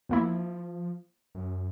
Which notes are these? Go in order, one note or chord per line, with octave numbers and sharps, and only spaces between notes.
E2 F3 A#3 E4
F#2